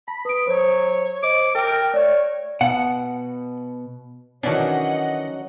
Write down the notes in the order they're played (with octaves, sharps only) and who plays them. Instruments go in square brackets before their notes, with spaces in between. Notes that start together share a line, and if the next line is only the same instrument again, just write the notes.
[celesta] A5 [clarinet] B5
[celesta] B4 D7 [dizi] D#6
[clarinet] F#3 [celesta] C5 [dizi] C#5
[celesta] C5 D#5 [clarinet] D6
[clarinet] A#4 [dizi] G5 [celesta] A5 D7
[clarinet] A3 [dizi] C#5 [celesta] D5
[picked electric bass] B2 [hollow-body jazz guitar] F#5
[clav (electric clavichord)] D#3 E3 D4 [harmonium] F#3 [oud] C#4 F#4 [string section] D#5 F#5